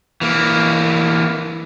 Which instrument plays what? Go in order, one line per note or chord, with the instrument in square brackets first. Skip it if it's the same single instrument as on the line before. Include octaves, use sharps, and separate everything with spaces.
[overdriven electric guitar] E3 A#3